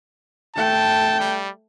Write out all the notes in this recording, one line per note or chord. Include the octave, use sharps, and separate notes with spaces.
A3 G5 A5
G3